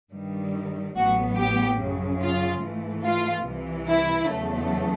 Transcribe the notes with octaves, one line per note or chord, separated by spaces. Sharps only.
G2 D#3 G3
A1 A2 F#3 B3 F#4
G4
F#2 C#3 F#3
F4
G#2 E3 A3
F4
C2 C3 E3
E4
E2 C#3 F#3 A3